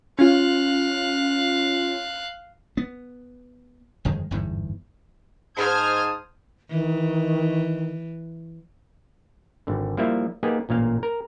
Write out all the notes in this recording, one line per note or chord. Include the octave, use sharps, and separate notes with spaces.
C#4 F4 F5 F#6
B3
G1 F2 D#3 G#3
G1 E2 G#2
G#2 C5 A5 D#6 F6 G#6
D#3 E3
G#1 D3
F3 G3 A#3 E4 E5
A#3 B3 D#4 G4 G#4
A1 A#2 A#3 F5
A#4